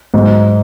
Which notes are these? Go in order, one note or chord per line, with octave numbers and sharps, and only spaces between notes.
G#2 F#3